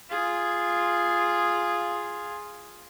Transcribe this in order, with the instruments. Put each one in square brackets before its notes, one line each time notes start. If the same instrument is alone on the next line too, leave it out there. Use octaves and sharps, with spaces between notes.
[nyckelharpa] F4 G#4